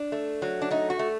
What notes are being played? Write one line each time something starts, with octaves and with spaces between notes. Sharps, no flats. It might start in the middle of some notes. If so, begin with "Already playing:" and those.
Already playing: D4
A3
F#3
D4
A3 D#4
F#4
A3